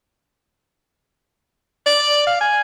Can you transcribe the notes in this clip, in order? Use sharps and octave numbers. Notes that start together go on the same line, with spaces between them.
D5
F5
G#5